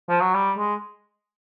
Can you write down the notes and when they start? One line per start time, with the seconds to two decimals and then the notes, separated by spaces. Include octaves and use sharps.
0.09 F3
0.21 F#3
0.35 G3
0.57 G#3